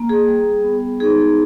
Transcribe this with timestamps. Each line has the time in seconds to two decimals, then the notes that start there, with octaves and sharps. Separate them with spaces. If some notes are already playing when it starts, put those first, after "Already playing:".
Already playing: A#3
0.09 G#4
0.27 G3
0.64 B3
1.00 D#4 G#4